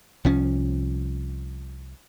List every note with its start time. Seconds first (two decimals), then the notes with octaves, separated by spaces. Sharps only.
0.25 C2 F3 C#4